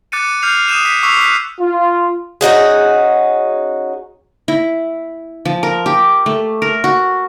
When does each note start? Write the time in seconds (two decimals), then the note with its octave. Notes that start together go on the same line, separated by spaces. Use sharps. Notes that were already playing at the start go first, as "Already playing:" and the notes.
0.12 D6 F#6 A6 C#7 D#7
0.42 D6 F6 G6 C7 F7
0.68 D#6 F#6 G6 D#7 E7
0.85 B6
1.03 C#6 D6 E6 B6 C7 F7
1.21 F#6 B6
1.59 F4
2.41 C#4 D#4 F#4 G#4
4.48 E4
5.45 F3
5.63 A#4
5.86 G4
6.26 A3
6.62 A#4
6.84 F#4